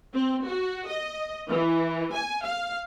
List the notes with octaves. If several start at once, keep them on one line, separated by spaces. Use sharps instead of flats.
C4
F#4
D#5
E3
G#5
F5